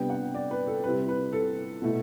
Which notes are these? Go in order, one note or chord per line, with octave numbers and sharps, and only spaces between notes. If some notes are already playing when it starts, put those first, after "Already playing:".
Already playing: C3 G3 B3 D4 G5
F#5
D5
B4
A4
C3 G3 C4 E4 B4
B4
A4
B2 A3 E4